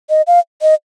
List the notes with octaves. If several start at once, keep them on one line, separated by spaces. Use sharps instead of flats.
D#5
F5
D#5